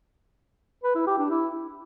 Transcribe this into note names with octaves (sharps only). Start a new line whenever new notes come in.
B4
E4
G4
D4
E4